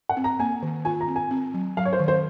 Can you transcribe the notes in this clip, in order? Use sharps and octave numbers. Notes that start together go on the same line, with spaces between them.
F#5
C4
A#5
A#3 G#5
D#3
F4 G#5
A#5
C4
G#5
C4
F#3
F#3 F5
C#5
C5
D#3
C5